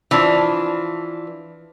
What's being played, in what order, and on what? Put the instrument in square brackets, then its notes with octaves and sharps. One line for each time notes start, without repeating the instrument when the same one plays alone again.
[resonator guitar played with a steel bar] E3 F3 D4